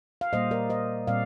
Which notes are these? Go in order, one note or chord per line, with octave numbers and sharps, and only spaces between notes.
F5
A#2 G3 A#3 C5 D#5
A#4 D5
C5 D#5
A#2 G3 C4 D5 F5